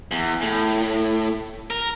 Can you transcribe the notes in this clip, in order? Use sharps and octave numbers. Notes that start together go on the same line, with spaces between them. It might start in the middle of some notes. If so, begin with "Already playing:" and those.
E2
A2
A#4